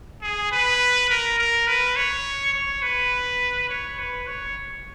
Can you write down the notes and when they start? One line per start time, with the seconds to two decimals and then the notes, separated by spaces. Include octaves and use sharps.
0.22 G#4
0.52 B4
1.10 A#4
1.38 A#4
1.67 B4
1.96 C#5
2.55 C#5
2.83 B4
3.69 C#5
3.99 B4
4.27 C#5